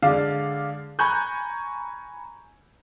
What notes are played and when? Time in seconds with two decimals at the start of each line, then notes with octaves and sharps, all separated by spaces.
0.02 D3 G#3 D5 F5
0.99 G#5 A#5 B5 C#6 F#6 G6